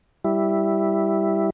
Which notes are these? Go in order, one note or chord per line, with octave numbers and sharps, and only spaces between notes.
G3 E4